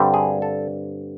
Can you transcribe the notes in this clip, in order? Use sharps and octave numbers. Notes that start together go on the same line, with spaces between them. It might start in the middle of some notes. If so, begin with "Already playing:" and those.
Already playing: G2 D3 G3 C4
G#4
A4